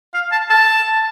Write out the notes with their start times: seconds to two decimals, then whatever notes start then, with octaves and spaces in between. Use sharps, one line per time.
0.14 F5
0.32 A5
0.50 A5